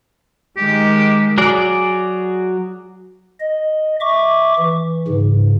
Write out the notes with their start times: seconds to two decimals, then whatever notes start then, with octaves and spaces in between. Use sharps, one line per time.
0.57 D#3 G#3 G4
1.38 F#3 F#4 G#4 D5
3.40 D#5
4.01 E5 C#6 D6
4.59 E3
5.08 G#2 C#3